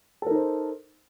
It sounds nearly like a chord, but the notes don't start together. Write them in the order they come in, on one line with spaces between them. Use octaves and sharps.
A4 A#4 D#4 C5